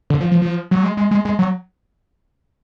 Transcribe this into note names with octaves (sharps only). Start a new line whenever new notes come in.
D3
F3
F3
F3
F#3
G#3
G#3
G#3
G#3
F#3